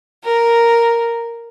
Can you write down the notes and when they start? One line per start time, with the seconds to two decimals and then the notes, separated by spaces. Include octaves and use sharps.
0.24 A#4